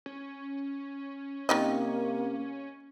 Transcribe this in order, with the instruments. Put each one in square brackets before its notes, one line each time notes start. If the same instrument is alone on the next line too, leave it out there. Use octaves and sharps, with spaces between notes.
[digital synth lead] C#4
[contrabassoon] C3 [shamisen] D#3 D#4 D#5 [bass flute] A#3